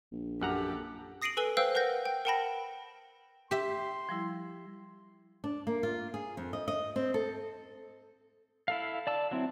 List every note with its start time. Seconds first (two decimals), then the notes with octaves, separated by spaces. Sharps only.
0.12 A#1
0.41 F#2 G4 A4 F#5 A#5
1.22 D#6 A#6 C7 D7 D#7 F#7
1.37 A4 B4 G#5 E6 G7
1.57 B4 C5 F5 G5 E6
1.75 A#4 B4 F#5 G6 A#6
2.05 G5
2.25 A#4 F#5 G5 A5 B5 A#6
3.51 G4 E5 C6
4.09 F3 G3 E4
5.44 D4
5.67 A#3
5.83 F4
6.14 G#4
6.37 F2
6.53 D#5
6.68 D#5
6.96 C4
7.14 A4
8.68 E4 A4 F5
9.07 D5 A5 E6
9.31 F#3 C4 E4